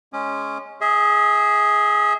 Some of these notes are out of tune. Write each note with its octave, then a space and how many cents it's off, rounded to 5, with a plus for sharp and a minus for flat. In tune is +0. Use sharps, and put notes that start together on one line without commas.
G#3 +0 C#4 +0 D#6 -45
G#4 +0 E5 -40